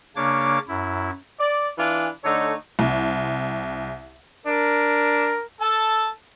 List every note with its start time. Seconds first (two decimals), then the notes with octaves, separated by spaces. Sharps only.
0.16 C#3 A#3 D4 C#5 D6
0.68 F#2 E4
1.40 D5
1.78 E3 D4 F4 G#5
2.24 D3 A3 D#4 A4 C#5
2.79 C2
4.46 D4 A#4
5.61 A4 A5